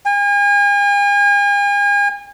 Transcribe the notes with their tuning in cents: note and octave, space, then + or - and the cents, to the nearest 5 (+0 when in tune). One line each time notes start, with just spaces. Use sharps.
G#5 -40